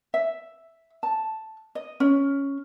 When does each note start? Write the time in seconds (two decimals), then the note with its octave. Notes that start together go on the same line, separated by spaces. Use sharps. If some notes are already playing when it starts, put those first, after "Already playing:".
0.14 E5
1.03 A5
1.75 D#5
2.00 C#4